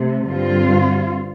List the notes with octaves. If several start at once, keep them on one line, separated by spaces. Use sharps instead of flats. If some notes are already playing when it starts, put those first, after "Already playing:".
Already playing: C3 A3
G2 D3 G3 C4 F4